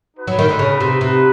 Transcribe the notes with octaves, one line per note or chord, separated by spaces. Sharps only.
D#4 F#4 B4
F#3
D#3
D3
C#3
C3
C3